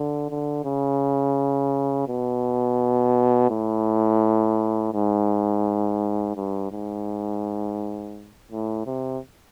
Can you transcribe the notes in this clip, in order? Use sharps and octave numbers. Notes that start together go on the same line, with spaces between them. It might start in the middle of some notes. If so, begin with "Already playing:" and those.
Already playing: D3
D3
C#3
B2
A2
G#2
G2
G#2
A2
C3